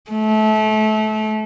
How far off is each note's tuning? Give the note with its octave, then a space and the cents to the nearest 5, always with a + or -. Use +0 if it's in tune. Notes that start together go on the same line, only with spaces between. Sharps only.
A3 -25